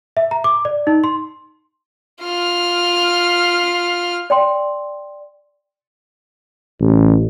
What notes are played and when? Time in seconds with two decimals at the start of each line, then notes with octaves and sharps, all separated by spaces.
0.17 E5
0.31 A#5
0.44 D6
0.65 D5
0.87 D#4
1.04 C6
2.22 F4 F6
4.30 D5 G5 C6
6.81 A1